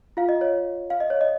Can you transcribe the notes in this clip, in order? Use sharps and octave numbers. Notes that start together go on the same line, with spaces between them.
F4 F5
D#5
C#5
F5
D#5
C#5
D#5